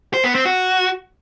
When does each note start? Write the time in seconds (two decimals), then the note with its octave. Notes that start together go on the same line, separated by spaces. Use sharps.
0.14 C5
0.24 B3
0.35 C4
0.46 F#4